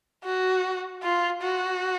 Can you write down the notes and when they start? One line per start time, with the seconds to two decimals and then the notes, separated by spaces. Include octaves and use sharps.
0.24 F#4
1.03 F4
1.42 F#4